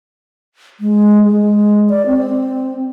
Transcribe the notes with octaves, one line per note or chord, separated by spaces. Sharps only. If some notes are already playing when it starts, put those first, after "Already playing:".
G#3
G#3
D5
C4